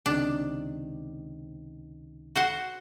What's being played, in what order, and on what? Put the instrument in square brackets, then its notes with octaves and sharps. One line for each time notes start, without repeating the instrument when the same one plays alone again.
[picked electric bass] C#2 C3 D#3 [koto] D4
[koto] F#4 C5 F#5